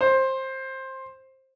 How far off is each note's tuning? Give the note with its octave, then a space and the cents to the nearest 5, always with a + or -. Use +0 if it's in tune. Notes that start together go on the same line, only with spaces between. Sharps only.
C5 +15